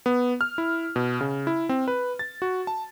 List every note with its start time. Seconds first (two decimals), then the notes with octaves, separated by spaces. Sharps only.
0.06 B3
0.41 F6
0.58 E4
0.96 B2
1.21 C#3
1.47 E4
1.69 C4
1.88 B4
2.19 A6
2.42 F#4
2.67 A5